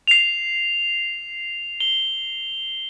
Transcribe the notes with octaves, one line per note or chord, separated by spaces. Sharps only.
C7 F7
G7